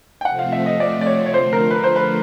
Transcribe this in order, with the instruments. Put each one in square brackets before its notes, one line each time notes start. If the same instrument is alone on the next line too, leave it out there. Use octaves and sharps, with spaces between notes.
[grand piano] G5
[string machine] C3 F3 A3 C4 [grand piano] F#5
[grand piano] F5
E5
D#5
D5
D5
C#5
C#5
[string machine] D3 F3 A3 [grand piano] C5
[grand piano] A#4
B4
C5
B4